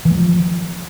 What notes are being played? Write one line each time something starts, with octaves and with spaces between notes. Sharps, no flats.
E3
G#3
F3